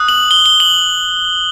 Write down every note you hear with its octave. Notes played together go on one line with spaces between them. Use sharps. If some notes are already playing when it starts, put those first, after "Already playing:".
Already playing: D#6 F#6
F#7
G7
G7
F#7